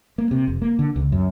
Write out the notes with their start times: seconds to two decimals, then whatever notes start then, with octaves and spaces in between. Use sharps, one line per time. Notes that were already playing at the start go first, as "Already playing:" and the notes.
0.18 A#3
0.31 C3
0.48 F1
0.62 A#3
0.79 D3
0.96 C#2
1.12 F#2